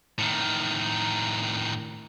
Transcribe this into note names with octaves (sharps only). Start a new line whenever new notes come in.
A2 D#3